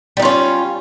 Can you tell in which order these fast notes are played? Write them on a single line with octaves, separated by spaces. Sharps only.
G3 D#4 F4 C#4